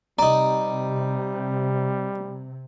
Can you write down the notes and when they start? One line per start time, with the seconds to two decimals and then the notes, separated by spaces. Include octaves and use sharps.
0.19 C3 G3 D#4 D5 A#5